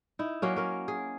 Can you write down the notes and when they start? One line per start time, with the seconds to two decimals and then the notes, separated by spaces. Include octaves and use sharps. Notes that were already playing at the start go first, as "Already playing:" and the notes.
0.19 D#4 E4
0.42 F#3 A#3 C#4
0.56 C#4 A#4
0.88 G#4